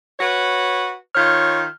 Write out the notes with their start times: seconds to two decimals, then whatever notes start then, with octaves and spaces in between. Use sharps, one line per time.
0.19 F#4 B4 C#5
1.15 D#3 F4 C#5 F6 G6